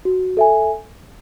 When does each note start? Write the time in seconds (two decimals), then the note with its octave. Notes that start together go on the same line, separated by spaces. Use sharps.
0.05 F#4
0.37 A4 E5 G#5